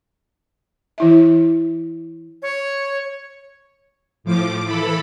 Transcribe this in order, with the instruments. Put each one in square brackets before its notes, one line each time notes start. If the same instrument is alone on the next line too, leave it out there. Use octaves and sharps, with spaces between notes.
[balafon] E3 E4 E5
[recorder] C#5
[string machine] A2 F3 D6
E3 A4 B5